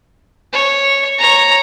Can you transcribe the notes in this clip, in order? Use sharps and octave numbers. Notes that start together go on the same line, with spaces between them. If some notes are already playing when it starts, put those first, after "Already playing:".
C#5
C#5 A#5